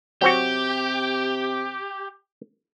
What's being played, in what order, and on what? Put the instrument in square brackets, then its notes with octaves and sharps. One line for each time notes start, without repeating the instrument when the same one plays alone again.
[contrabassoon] C3 [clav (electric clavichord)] F#3 C4 F#4 [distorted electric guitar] G4